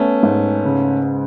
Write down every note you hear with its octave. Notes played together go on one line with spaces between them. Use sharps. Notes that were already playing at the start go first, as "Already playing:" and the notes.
Already playing: A3 B3 C#4
G#2
C#3